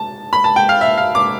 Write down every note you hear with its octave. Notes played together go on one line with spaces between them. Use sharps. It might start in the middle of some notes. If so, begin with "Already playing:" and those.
Already playing: A5
B5
A5
G5
F5
E5
F5
D6